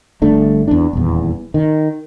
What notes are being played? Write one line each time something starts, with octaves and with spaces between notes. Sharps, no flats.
G1 A3 D4
E2 D4
D#1 E2
D#3